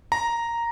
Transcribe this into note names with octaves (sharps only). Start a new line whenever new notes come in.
A#5